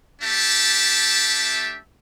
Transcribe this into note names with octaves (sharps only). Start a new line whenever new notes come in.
A3 D4 G4 E5 A5